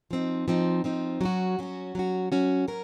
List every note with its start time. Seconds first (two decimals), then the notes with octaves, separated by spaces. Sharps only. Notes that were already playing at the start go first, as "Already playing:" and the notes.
0.11 F3 C4 D#4
0.48 F3 C4 D#4
0.84 F3 C4 D#4
1.21 F#3 C#4 F#4
1.59 F#3 C#4 F#4
1.95 F#3 C#4 F#4
2.32 F#3 C#4 F#4
2.68 F#3 C#4 A#4